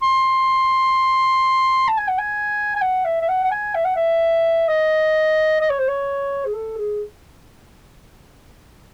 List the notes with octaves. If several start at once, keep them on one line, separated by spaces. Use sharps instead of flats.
C6
A5
G#5
F#5
G#5
G#5
F#5
E5
E5
F#5
F#5
G#5
E5
F#5
E5
D#5
D#5
C#5
C5
C#5
G#4
A4
G#4